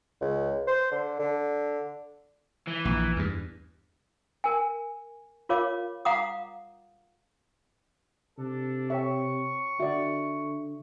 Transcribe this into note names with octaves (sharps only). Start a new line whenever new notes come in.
C#2
C5
D3
D3
E3
A#1
E2 G2
A#4 G#5
F4 A#4 C#5 F5 D6
F5 F#5 A#5 D6 D#6
C3 D4 A4
A4 C#5 E5 G5 C#6
D3 F#4 D5 E5